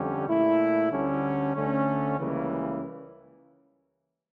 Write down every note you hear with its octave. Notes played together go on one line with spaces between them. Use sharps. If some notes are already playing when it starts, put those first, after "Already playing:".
Already playing: F2 D3 G3 C#4 G4
A#2 A3 E4
D2 D3 G3 C#4
D2 D3 A3 C#4
C#2 C#3 E3 G3 A#3